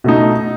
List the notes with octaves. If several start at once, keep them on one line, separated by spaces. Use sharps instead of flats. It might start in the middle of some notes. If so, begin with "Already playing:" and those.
B2 A3 D#4